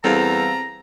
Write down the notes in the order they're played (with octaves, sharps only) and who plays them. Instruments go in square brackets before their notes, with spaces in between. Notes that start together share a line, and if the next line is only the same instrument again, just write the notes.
[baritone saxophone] E2 [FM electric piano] G3 F5 [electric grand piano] C4 A4 [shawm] A#5